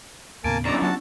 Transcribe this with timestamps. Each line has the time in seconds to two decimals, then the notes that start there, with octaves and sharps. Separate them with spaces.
0.44 D#2 A2 C#3 A#3 B3 G#5 A5
0.65 F#2 D3 C#4 E4 D5 A#5
0.82 F#3 F#4 A5